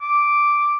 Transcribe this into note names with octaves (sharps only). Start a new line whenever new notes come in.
D6